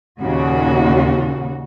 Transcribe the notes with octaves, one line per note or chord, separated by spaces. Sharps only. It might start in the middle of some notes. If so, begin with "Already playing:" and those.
D#2 A#2 C#3 F#4